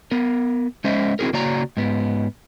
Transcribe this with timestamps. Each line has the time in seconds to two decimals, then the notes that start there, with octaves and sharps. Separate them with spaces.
0.11 B3 A#4
0.84 G#3 C#4 C5 D#5 E5
1.19 C4 E4 F#4 G#4 A#4
1.33 C#3 A#3 F#4 C#5 D5 A#5
1.77 G#2 B3